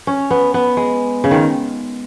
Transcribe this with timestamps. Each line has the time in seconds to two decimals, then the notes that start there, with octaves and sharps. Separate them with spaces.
0.07 C#4
0.31 B3
0.54 B3
0.77 G#3
1.24 C#3
1.31 D#3